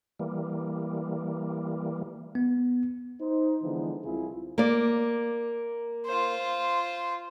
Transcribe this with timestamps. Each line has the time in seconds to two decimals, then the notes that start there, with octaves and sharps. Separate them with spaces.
0.19 E3 G3 A#3
2.35 B3
3.21 D#4 C5
3.62 D3 E3 F3 G#3 B3 D#4
4.03 C2 C3 E4 F4 G#4
4.58 A#3 D5
6.06 F4 C5